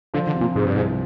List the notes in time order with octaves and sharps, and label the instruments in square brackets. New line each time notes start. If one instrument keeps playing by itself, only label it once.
[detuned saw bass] D3 [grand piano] F3
[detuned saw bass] D3
[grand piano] C3
[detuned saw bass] A#2
[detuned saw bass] G#2 [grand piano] C3
[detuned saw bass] G2
[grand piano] C2 [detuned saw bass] G#2